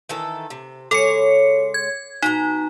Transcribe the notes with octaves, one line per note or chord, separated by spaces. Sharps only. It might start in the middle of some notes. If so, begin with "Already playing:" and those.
D#3 E3 A4
C3
C#3 G#3 A4 C#5 C#7
G#6
B2 D#4 F#4 A#5